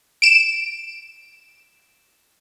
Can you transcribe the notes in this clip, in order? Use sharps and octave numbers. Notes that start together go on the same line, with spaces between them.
D7 E7